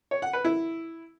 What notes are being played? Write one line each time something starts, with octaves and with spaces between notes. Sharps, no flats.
C#5
F#5
B4
E4